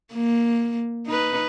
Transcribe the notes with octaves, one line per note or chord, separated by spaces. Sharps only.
A#3
D#4 B4